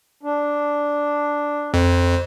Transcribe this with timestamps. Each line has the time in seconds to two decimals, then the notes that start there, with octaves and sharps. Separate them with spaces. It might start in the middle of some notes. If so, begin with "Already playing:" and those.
0.23 D4
1.74 F2 C5